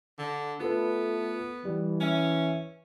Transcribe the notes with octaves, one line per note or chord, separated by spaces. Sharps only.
D3
A3 B3 F4 A4 B4
E3 G3
C#4 E5 G#5